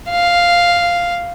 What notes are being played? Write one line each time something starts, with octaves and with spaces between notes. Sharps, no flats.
F5